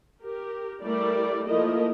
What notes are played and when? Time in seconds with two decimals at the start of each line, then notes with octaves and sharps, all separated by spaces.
0.22 G4 A#4
0.83 G3 A3 E4 A#4 D5
1.47 F3 A3 A#3 E4 A#4 D#5